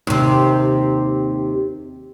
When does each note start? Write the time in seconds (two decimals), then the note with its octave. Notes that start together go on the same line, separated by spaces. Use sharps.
0.07 D#2 C3